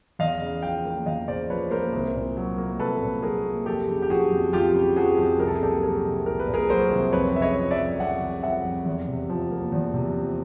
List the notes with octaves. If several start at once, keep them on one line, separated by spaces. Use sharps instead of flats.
E2 D#5 F5
C#3
F3 F5 G5
A#3
E2 D#5 F5
C#3 C5 D5
F3 B4 C#5
A#3 A#4 C5
C2
A#2
F#3
A#3
C2 A4 B4
A#2
F#3 G#4 A#4
A#3
F2 G4 A4
C#3
G4
F3 F#4 G#4
F2
F2 F4 G4
C#3
F3 F#4 G#4
F2
C2 A#4
A4
G#4
A#2 G4 A4
F#3 G#4 A#4
C2
C2 A#4
B4
A#2
G#4 A#4
F#3 A#4 C5
C2
F2 B4 C#5
C#3 E5
C#5 D#5
F3
D5 E5
F2
F2 E5 F#5
C#3
F3 E5 F#5
F2
E2
C3
F3
A#3
E2
C3
F3